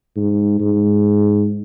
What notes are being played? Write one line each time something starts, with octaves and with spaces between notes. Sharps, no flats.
G#2
G#2